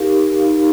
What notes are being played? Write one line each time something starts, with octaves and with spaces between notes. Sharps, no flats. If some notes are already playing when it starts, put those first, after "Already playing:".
Already playing: D#4 G4 A#4 F5
D#4 G4 A#4 F5